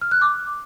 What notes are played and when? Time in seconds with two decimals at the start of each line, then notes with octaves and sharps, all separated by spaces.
0.01 F6
0.11 F#6
0.21 D6